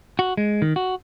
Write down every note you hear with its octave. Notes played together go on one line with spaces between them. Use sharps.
F#4
G#3
D#3
F#4